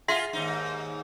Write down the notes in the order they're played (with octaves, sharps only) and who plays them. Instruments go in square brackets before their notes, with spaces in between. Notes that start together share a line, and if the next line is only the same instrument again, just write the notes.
[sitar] F4 G#4 [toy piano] E5 F#5 C6
[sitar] D#2 G#2 D#4